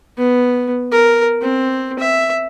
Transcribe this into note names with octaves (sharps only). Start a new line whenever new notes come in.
B3
A#4
C4
E5